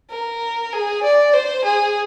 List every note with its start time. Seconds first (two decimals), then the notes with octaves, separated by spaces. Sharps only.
0.11 A#4
0.73 G#4
1.03 D5
1.33 C5
1.65 G#4